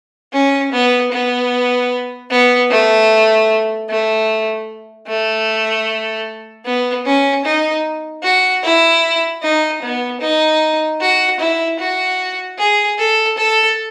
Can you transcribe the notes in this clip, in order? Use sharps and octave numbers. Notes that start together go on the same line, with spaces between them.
C#4
B3
B3
B3
A3
A3
A3
B3
C#4
D#4
F#4
E4
D#4
B3
D#4
F#4
E4
F#4
G#4
A4
A4